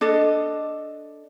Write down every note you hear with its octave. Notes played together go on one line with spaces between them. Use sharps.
D4 A4 D#5